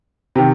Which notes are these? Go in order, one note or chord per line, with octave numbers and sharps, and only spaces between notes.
C3 D#3